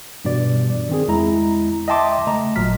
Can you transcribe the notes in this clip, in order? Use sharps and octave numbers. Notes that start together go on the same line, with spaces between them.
G2 B2 E3 D5
D#3 C4 G#4
E2 G#3 E4 A#5
D#5 E5 G5 A5 C6 D6
C#3 A3 D#5 A#5
G#1 A#2 F#3 F6 B6